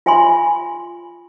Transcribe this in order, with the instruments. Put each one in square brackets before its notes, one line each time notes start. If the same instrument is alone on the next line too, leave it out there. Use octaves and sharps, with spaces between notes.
[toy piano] F4 E5 G#5 B5 C6